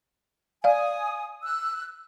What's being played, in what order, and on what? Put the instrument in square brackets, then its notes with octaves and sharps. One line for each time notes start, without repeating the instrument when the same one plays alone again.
[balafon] D5 F5 [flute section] G#5 D#6
[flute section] E6 F#6